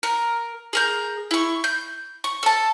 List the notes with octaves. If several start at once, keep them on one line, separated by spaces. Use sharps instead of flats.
A#4
G#4 A#4 G6
E4 C#6
G6
C#6
A4 A5